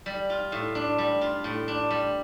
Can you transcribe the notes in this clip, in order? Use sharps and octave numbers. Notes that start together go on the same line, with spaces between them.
G3
F4
A2
D4
G3
F4
A2
D4
G3